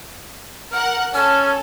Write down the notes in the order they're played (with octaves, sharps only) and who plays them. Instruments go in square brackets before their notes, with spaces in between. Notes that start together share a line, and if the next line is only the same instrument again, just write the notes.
[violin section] A#4 F#5 [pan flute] F6
[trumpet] C#4 [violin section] A4 [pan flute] F6